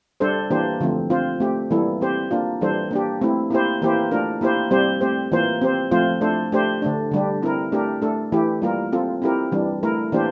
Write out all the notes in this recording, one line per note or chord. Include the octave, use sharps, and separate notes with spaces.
G3 D4 A4 C5
E3 A#3 D4 G4 C5
D3 F3 A3 C4
C4 F4 C5
A3 C4 G4
E3 G3 A#3 E4 A4
C4 G4 C5
A#3 D4 F4
E3 G3 D4 A4 C5
A#3 D4 G4
A3 C4 E4
A#3 E4 G4 C5
E3 A#3 E4 G4 C5
A3 D4 F4 A#4
A#3 E4 G4 C5
G3 C4 G4 C5
A3 C4 G4 C5
E3 A#3 F4 C5
C4 G4 C5
F3 A3 C4 F4 C5
A3 D4 A4 C5
A3 D4 G4 C5
D3 A3 D4
D3 G3 D4 G4
C4 E4 A#4
A3 D4 G4 A#4
A3 D4 A4
E3 A3 E4 G4
G3 A#3 F4 A#4
C4 F4 A4
C4 E4 G4 A#4
E3 G3 D4
A3 E4 A#4
E3 A#3 D4 G4 C5